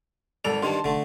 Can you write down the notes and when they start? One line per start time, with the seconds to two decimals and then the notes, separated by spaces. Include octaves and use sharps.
0.45 G#1 A4 D5 F7
0.62 G2 D#3 G3 A5 C6
0.84 F1 D3 A3